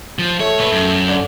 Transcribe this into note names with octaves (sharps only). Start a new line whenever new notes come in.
F3
A3 C#5
A#2 B4
F#2
D3